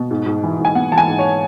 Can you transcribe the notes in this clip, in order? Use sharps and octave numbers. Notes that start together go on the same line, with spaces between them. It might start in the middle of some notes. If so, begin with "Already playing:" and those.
Already playing: B2
G#2
G#2
E3
G#2
G#5
B3 F#5
E3 A5
G#5
G#2
C#5